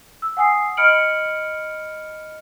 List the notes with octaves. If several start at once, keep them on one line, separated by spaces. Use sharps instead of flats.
E6
F#5 G#5 D#6 C7
D#5 B5 F6 C#7 D7 F#7